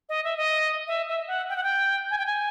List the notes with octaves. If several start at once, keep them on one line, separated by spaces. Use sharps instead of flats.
D#5
E5
D#5
E5
E5
F#5
G5
F#5
G5
G#5
G5
G#5